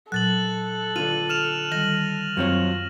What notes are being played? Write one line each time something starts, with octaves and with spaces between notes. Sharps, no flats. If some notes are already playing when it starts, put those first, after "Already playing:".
A#2 F#3 A4 F#6 A6 F#7
D3 F4 D#7 F#7
F6 E7 F7
D#3 G3 A#6 F#7
F#2 F#3 C4 F4 C#5